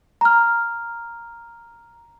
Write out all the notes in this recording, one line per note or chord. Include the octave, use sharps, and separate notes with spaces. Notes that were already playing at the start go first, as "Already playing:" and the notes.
A#5 F6